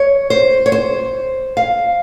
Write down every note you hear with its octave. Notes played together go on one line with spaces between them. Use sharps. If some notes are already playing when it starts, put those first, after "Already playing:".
Already playing: C#5
C5
C#5
C5
F5